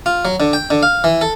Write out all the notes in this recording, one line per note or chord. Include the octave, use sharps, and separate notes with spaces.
F4
F#3
D3
G5
D3
F5
E3
A4